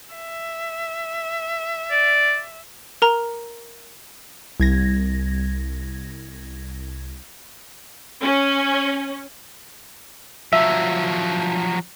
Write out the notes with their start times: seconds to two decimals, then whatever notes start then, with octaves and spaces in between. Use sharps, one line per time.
0.15 E5
1.91 D5
3.02 A#4 A#5
4.60 C2 G#6 A#6
8.22 C#4
10.53 F3 F#3 E5